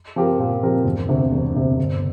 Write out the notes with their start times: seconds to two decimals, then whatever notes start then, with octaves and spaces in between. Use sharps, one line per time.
0.16 F3 C4 G4 A#4
0.39 A#2
0.63 F3 C4 G4 A#4
0.85 E1
1.09 D2 C3
1.31 E1
1.54 D2 C3
1.78 G1